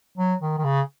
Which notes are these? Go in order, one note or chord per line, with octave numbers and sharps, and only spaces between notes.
F#3
D#3
D#3
C#3